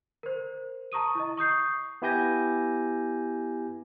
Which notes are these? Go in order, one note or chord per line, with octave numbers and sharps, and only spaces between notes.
A#4 C5
A5 A#5 C#6 D#6 D#7
E4 D#5
C#6 D#6 G6 C7
B3 E4 G4 G#5 G6 A#6